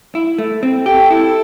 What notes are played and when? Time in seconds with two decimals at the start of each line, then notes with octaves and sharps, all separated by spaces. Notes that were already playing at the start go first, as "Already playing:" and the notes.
0.15 E4
0.39 A3
0.63 C4
0.86 G4 A4
1.11 E4